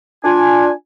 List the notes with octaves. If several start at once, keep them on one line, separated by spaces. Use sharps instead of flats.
D4 F4 G#5